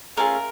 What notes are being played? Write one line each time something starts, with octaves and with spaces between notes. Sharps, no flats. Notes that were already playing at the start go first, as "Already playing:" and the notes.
A3 C#4 F4 G#4 A#4